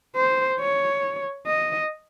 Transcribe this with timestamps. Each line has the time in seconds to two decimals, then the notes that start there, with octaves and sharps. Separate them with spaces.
0.16 C5
0.60 C#5
1.47 D#5